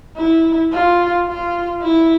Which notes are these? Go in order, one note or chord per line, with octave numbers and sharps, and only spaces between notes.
E4
F4
F4
E4